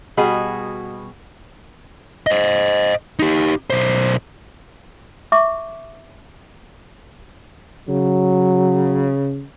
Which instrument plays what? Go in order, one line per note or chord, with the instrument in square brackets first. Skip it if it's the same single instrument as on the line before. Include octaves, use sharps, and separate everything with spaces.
[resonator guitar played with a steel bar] B2 G3 F#4 G#4 D#5
[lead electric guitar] C5 D#5
D#4 G4
B1 C5
[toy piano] E5 C#6 D6
[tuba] C#3 [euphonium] F#3